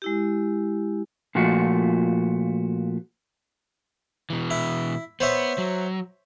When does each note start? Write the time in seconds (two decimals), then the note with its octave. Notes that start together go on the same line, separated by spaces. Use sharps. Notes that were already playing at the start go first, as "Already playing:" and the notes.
0.02 G#3 E4 G4
1.35 A#2 F3 A3 F#4
4.30 B2 E3
4.51 E4
5.20 B3 C5 C#5 E5
5.58 F#3